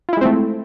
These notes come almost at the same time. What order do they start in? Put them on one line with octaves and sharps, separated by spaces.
F4 E4 G#3 C4 A3